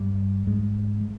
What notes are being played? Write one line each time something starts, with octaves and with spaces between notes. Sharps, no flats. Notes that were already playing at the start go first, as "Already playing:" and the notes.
Already playing: G2 G3
G#2 G#3
G#3